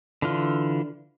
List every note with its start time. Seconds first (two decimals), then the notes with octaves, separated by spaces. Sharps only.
0.22 D3 E3 F4